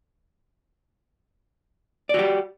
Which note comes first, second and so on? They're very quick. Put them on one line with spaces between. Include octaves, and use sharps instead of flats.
D5 F#4 G4